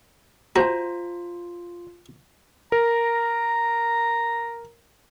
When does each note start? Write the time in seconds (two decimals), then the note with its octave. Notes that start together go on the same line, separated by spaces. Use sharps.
0.56 F4 F#4 C5 A5 A#5
2.72 A#4 A#5